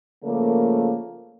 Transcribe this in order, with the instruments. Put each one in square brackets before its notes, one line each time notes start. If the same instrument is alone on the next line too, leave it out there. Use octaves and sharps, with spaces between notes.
[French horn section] C#3 F3 A3 A#3